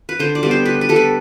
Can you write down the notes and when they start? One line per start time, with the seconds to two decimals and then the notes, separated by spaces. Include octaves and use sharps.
0.09 B4
0.19 D3 C5
0.35 D5
0.43 G3 B3
0.51 C5
0.65 D3 B4
0.81 B4
0.89 G3 B3 A4
0.96 B4